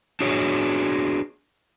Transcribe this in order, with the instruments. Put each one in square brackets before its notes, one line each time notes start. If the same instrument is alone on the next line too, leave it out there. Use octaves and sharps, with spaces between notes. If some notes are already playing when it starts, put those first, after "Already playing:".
[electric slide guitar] D4 F#4 G#4 C#5